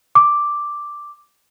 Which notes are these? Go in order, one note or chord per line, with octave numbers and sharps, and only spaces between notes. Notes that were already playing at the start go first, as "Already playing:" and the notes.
D6